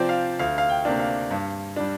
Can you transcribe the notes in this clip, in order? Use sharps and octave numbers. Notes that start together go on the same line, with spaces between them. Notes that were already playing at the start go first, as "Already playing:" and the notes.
Already playing: C3 F3 C4 D5
F5
D2 F5
F5
G5
C3 A#3 D4
F5
G2
G3 D4